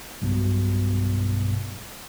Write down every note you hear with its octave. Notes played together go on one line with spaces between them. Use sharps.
B1 G2 B2